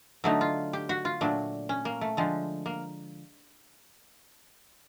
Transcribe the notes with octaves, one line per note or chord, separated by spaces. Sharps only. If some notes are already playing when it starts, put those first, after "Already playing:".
D3 F#3 A3 D#4
F4
G4
F#4
F4
A#2 F#3 A3 D4
C#4
A#3
A3
D3 F3 G#3
A#3